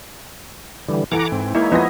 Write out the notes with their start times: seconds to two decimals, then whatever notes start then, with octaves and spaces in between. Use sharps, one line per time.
0.88 D3 E3 G3
1.12 E3 A4 F#5 A#5 D6 D7
1.32 G#2 C4
1.55 G#3 A#3 D#4 E4 C#5
1.72 F3 B3 E4 D#5 A#6